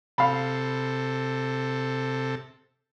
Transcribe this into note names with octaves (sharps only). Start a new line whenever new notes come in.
C3 A4 F5 B5